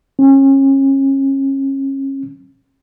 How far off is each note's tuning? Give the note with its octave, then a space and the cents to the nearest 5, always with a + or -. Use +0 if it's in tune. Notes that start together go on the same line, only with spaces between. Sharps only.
C#4 -30